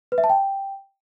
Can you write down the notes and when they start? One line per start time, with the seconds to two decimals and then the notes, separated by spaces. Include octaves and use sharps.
0.12 B4
0.18 E5
0.24 A5
0.30 G5